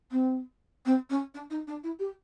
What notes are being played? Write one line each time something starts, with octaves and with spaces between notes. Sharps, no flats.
C4
C4
C#4
D4
D#4
D4
E4
G4